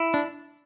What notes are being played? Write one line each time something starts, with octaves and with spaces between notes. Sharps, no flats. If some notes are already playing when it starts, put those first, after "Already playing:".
Already playing: E4
D4